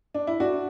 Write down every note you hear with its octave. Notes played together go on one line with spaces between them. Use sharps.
D4
E4
D4 F#4